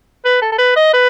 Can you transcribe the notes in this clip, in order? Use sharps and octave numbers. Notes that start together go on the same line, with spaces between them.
B4
A4
A4
B4
D#5
B4